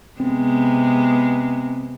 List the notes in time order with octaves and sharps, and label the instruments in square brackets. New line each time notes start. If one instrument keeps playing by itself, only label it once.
[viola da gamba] C3 G#3 B3 [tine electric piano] C4